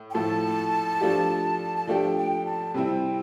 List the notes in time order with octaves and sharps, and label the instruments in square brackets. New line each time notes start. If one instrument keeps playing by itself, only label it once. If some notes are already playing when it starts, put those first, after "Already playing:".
Already playing: [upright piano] A2
[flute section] G5
[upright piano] A2 F3 A3 E4 A4 [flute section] A5
[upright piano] F3 A3 D4 G4
[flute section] A5
[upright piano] F3 A3 D4 G4 [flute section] G5
[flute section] G5
A5
[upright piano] C3 G3 C4 E4 [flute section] G5